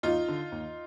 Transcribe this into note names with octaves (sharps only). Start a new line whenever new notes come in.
D#2 D#4 F4
D3
D#2